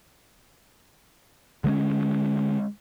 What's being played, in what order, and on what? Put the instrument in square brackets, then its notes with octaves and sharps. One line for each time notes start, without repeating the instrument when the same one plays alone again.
[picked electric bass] D3 G#3 A3 C#4